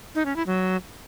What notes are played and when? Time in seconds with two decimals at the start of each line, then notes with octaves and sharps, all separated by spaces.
0.15 D#4
0.26 C#4
0.36 E4
0.47 F#3